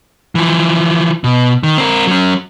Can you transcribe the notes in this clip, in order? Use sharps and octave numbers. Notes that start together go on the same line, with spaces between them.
E3 F3
B2
D#3
C4 A#4
F#3 C#4